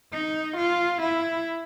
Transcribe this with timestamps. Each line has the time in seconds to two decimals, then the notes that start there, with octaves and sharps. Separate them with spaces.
0.12 D#4
0.57 F4
1.02 E4